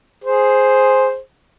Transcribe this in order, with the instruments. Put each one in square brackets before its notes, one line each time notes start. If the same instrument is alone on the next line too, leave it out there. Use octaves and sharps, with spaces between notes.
[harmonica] G#4 C5